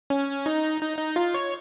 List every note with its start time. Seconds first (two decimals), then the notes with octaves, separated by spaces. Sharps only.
0.10 C#4
0.46 D#4
0.81 D#4
0.98 D#4
1.16 F4
1.34 C#5